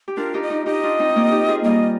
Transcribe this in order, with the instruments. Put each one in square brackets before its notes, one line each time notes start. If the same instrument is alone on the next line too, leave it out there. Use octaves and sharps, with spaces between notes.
[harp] G4
[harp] D4 F4 [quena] A#4
[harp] D#4 G4
[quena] D#5
[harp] D#4 G4
[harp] D#4 G4 [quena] D#5
[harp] D4 F4
C4 D#4
D#4
A#3 D4
D#4 G4
F4 G#4
[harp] G3 A#3 [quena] D#5